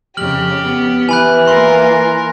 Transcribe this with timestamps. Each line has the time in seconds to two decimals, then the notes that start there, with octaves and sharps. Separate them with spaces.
0.17 F2 C#3 G4 F6 F#7
0.63 B3
1.09 E3 G#5 B5 F#6
1.48 A#3 F4 A#4 C6